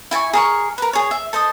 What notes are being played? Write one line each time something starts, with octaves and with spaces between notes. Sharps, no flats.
E4 G#5 A5 C#6
G#4 A#4 C#6
A#4 B4
G#4 C#5
E5
A4 C5 D#5 D#6